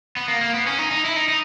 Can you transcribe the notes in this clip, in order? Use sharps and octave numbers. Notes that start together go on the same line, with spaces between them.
B3
A#3
A#3
B3
C#4
D#4
D#4
E4
D#4
D#4